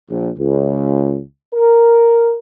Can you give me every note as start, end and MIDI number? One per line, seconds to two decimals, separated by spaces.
0.10 0.30 34
0.38 1.21 37
1.55 2.37 70